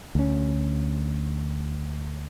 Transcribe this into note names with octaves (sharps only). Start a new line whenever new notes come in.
D2 C#4